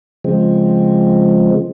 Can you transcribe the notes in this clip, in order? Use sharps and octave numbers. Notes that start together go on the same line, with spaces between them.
C#3 F3 G#3 C4